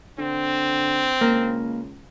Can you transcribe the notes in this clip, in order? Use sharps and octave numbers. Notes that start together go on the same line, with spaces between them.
D3 C4
C#2 A#3